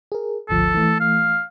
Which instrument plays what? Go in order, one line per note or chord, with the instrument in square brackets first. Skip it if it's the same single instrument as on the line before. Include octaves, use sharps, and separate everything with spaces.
[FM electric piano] G#4 A#4
[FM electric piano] G#1 D2 F3 [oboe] A4
[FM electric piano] E3 A3
[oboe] F5